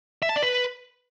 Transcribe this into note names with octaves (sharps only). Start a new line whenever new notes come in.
E5
A5
D5
B4